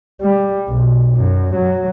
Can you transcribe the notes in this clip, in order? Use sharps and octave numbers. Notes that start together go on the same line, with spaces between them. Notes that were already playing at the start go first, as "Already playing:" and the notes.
G3
B1
F#2
F#3